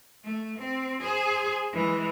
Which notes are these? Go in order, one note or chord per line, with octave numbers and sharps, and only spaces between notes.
A3
C4
G#4 C5
E3 G#3